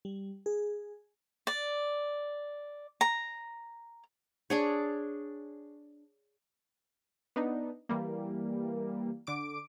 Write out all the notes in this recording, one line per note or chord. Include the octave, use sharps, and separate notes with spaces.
G3
G#4
D5
A#5
D4 G#4 C#5
B3 D4 D#4
E3 G3 A#3
D3 D6 D7